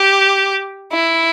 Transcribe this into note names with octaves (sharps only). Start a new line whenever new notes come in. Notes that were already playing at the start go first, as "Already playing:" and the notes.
Already playing: G4
E4